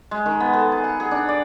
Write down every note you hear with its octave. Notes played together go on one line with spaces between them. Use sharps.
G#3
D#3
B3
A4
G#4
F#5
G#4
D4
D5